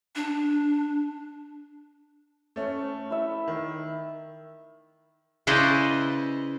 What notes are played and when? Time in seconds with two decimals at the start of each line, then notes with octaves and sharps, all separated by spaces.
0.16 D4
2.56 A3 C#4
3.10 E4 E5
3.48 D#3
5.47 C#3 E4 B4 C5 D5 D#5